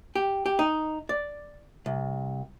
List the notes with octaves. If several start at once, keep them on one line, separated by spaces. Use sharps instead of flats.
G4
G4
D#4
D5
C2